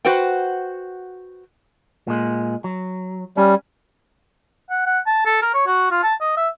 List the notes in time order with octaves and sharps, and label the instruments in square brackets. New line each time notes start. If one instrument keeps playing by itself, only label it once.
[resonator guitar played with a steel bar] F#4 B4 C5 F#5 G5
[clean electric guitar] A#2 G#3
F#3
[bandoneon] G3 [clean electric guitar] C#4
[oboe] F#5
F#5
A5
A4
A#4
C#5
F#4
F4
A5
D#5
E5